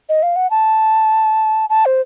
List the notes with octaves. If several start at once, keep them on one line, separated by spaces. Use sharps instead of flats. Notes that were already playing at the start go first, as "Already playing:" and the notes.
D#5
F5
F#5
A5
A5
C5